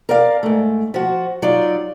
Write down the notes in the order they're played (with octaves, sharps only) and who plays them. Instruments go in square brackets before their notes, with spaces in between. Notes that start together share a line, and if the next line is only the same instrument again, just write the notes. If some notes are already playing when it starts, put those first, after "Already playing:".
[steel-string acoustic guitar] A#4 D5 F5
G#2 A3
F3 F#4
F#3 D#4 F4 D5